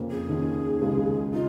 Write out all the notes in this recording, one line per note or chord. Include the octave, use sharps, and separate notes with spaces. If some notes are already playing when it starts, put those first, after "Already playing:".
Already playing: F2 C#3 A#3 C#4
G#4
D#2 D#3 C#4
C#2 C#3 G#3
D#4 F4